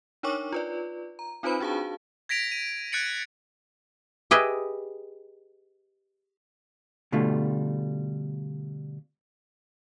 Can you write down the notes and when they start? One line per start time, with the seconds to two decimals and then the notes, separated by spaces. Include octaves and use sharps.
0.23 D4 D#4 A#4 C#5 C#6 D6
0.52 F4 B4 D5
1.19 A#5
1.43 C4 D#4 F4 B4 C5 B5
1.60 D4 F#4 G#4 F5 A5
2.29 G#6 A#6 B6 D7 F7
2.52 D#7
2.92 F#6 G#6 A6 C#7 D7 F#7
4.31 G4 G#4 B4 D#5 E5
7.12 B2 D3 G3 A3 F4